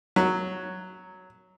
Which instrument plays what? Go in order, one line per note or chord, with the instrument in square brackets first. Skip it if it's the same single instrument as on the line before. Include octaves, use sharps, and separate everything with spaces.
[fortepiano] F#3